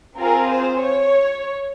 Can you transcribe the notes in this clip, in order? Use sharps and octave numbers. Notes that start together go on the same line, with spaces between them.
C4 F4 G#4 A#4
C5
C#5